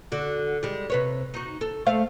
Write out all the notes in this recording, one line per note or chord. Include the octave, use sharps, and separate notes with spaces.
D3 F#4
G3 G#3
C3 B4 C#5
D#4 F#4
A4
A3 C5 F5